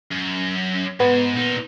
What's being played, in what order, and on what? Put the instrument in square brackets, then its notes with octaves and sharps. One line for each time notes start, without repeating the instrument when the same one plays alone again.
[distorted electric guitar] F#2
[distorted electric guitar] G#2 [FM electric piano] B3
[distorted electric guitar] A#2 D#4